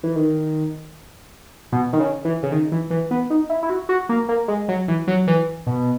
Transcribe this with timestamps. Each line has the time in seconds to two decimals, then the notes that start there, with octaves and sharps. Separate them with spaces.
0.03 E3
0.16 D#3
1.72 B2
1.93 D#3
2.00 C#3
2.25 E3
2.43 C#3
2.52 D#3
2.72 E3
2.90 E3
3.11 B3
3.30 D#4
3.49 E4
3.63 E4
3.70 F#4
3.89 F#4
4.09 A#3
4.29 A#3
4.48 G#3
4.68 F#3
4.88 E3
5.07 F#3
5.27 E3
5.67 B2